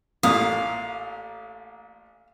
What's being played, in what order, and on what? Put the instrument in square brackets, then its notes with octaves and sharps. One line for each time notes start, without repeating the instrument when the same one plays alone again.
[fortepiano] A1 A#2 D#6 [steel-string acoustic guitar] F5